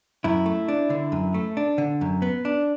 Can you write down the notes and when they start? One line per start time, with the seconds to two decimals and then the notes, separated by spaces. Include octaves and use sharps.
0.24 F#2 E4
0.46 A3
0.68 D4
0.90 D3
1.12 F#2
1.34 A3
1.57 D4
1.78 D3
2.01 F#2
2.22 B3
2.45 D4